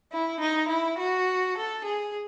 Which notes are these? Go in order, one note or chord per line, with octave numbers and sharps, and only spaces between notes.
E4
D#4
E4
F#4
A4
G#4